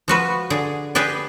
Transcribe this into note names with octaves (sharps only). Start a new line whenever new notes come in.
F3 F#4 B4
D3 G#4
G4 G#4 B4 D5